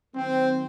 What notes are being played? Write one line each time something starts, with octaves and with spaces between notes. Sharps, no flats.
D#3 F#3 A#3 C4